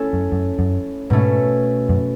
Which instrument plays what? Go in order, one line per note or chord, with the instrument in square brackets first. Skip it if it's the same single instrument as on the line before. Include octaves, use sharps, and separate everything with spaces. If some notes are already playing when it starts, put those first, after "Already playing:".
Already playing: [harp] A3 C#4 E4 A4 C#5
[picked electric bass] F#2
F#2
F#2
[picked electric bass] G#2 [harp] B2 A3 C#4
[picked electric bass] F#2